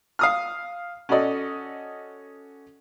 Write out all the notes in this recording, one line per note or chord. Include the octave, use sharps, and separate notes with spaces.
F5 D#6 F6
C#4 F#4 A4 D5 D#5